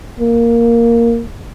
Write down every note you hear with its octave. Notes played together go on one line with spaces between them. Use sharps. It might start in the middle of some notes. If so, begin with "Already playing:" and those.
A#3